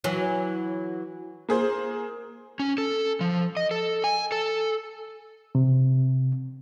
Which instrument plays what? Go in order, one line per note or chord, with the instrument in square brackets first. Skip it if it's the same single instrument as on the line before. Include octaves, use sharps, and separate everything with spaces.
[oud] E3 F#3
[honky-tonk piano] A#3 G#4 C5
[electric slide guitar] C#4
A4
F3
D#5
A4
G#5
A4
[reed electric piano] C3